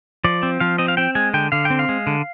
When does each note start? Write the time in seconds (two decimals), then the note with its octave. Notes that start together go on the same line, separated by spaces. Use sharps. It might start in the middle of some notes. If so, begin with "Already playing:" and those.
0.24 F3 D5
0.43 C4
0.60 F3 F5
0.78 C4 D#5
0.88 F5
0.97 C4 G5
1.15 G#3 G#5
1.34 D3 G5
1.52 D3 F5
1.65 G5
1.70 C4
1.79 F5
1.89 G#3
2.07 D3